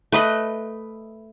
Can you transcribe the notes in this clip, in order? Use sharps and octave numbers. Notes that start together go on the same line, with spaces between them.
A3 B4 D#5 B5